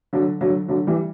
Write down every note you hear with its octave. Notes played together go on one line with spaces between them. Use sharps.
D3 F#3
D3 F#3
D3 F#3
E3 G3